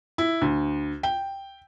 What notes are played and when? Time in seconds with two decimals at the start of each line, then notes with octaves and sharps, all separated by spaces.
0.18 E4
0.41 D2
1.03 G5